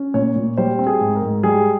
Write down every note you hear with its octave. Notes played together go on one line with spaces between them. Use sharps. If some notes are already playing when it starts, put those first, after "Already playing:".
Already playing: C#4
A#2 C#5
A#2
G3 C5
C4
G#4
G#2
A#4
G#2
G3 G#4